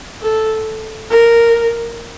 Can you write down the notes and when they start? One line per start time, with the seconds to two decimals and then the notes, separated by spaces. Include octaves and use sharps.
0.21 A4
1.10 A#4